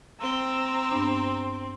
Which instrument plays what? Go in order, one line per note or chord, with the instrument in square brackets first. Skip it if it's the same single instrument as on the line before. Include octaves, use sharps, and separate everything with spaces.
[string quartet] C4 [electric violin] A#5 E6
[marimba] G2 B3 D4